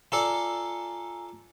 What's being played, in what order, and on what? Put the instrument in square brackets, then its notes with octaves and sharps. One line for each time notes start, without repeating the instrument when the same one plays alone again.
[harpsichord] F4 A4 D5 [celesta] G#5 A#5